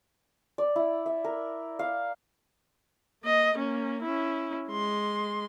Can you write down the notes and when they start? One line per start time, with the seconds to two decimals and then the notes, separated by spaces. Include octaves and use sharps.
0.58 D5
0.76 E4
1.06 E5
1.24 A#4
1.79 F5
3.23 A#3 D#5
3.54 A#3 C#4
4.02 C#4 E4
4.70 G#3 C6